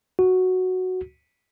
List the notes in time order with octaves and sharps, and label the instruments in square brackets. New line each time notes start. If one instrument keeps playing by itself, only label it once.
[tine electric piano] F#4